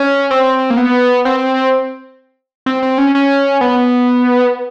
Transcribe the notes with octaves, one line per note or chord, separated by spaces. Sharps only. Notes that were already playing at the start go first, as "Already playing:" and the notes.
Already playing: C#4
C4
A#3
B3
C4
C4
C4
C#4
C#4
B3